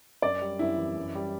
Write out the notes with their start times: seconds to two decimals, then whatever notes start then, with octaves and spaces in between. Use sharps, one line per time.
0.22 F#2 D5
0.41 G3
0.59 F#2 E4
0.78 E3
0.97 F#2
1.15 G3